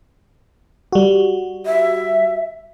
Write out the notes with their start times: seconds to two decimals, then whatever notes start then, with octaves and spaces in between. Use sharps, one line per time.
0.92 G3 F#4
1.66 E5